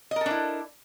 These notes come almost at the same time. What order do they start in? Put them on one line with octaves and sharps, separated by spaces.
D#5 A#4 A4 D4 E4